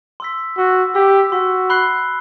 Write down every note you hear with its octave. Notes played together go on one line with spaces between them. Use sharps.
C6 E6 B6
F#4 C6 E6 B6
G4 C6 E6 B6
F#4 C6 E6 B6
B5 F#6 C7 G7